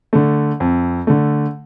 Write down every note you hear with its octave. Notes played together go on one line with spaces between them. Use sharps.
D3 A3
F2
D3 A3